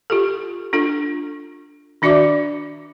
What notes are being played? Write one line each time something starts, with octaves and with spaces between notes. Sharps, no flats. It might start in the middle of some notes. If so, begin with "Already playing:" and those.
F4 G4 A4
D4 F4 A4
D#3 D4 F#4 D5 E5 D6